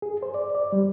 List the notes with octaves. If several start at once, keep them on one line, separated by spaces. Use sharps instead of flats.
G#4
C5
D5
D5
G3